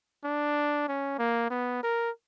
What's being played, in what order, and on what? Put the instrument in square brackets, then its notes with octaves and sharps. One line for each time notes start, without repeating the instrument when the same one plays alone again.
[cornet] D4
C#4
A#3
B3
A#4